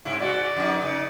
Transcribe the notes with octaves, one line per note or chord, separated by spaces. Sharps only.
G2 C3 E4
G#2 G#3 F#4 D5
F2 D#4
C#3 D#4